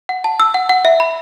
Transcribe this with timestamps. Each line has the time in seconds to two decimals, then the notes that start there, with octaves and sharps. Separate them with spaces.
0.09 F#5
0.24 A5
0.40 E6
0.54 F#5
0.69 F#5
0.85 E5
1.00 B5